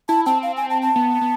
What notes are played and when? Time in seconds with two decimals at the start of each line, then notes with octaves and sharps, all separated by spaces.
0.08 E4 A5
0.26 C4 A5
0.43 F5
0.57 G#5
0.70 A5
0.82 A5
0.96 B3
1.21 B3